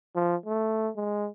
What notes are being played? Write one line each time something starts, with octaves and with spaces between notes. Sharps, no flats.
F3
A3
G#3